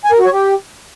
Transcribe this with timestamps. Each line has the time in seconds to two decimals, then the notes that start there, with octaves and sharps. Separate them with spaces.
0.05 G#5
0.12 A#4
0.19 F#4
0.26 C#5
0.33 G4